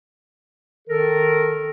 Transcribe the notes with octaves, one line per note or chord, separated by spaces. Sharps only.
D#3 A4 A#4